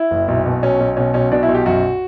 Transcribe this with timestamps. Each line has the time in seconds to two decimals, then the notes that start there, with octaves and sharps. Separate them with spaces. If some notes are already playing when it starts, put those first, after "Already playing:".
Already playing: E4
0.11 F#1
0.28 B1
0.46 B2
0.62 B1 C#4
0.80 B1
0.97 B2 C#4
1.14 B1 C#4
1.32 B2 D4
1.43 E4
1.48 B1
1.54 G4
1.66 F#2 F#4